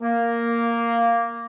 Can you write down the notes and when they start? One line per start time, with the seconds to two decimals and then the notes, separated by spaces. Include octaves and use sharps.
0.02 A#3